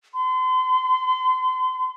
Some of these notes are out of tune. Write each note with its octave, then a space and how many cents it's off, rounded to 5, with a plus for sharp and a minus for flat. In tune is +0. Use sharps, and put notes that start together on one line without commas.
C6 -40